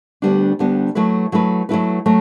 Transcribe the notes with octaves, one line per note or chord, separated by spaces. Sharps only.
D2 D3 G3 B3 D4
D2 D3 G3 B3 D4
F#3 A3 E4 B4
F#3 A3 E4 B4
F#3 A3 E4 B4
F#3 A3